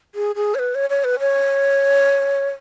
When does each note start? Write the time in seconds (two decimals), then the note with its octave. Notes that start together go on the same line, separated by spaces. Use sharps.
0.15 G#4
0.36 G#4
0.55 C#5
0.59 B4
0.75 C#5
0.90 C#5
1.04 B4
1.20 C#5